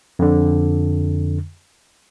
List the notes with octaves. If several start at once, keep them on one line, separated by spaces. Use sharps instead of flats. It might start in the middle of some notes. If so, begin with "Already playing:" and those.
F2 D3